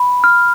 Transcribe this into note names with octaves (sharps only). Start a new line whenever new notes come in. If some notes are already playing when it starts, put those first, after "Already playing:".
Already playing: B5
F6